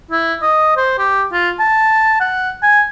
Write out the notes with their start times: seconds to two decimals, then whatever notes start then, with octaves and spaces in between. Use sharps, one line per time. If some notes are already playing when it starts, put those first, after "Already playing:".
0.11 E4
0.42 D#5
0.77 C5
0.98 G4
1.32 F4
1.59 A5
2.20 F#5
2.63 G#5